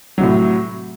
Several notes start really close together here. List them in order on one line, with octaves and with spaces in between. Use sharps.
F#3 C3 A2